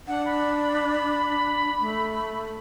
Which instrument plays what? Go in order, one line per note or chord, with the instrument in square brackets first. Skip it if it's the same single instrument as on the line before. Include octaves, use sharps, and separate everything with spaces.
[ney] D4 [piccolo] F#5
[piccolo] B5
[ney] A3